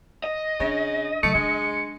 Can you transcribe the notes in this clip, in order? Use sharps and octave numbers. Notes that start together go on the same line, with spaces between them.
D#5
C#3 D4
C#3 F#3 A3 C#7
G#3 D4